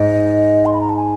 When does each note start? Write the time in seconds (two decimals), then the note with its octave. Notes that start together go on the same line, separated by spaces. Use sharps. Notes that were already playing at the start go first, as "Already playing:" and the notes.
Already playing: G#2 D#5
0.66 C6
0.73 B5
0.81 A#5
0.89 A5
0.96 G#5